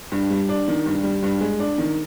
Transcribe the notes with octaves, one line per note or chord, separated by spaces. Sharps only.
G2
G3
D4
D#3
G2
G3
G2
G#3
D4
D#3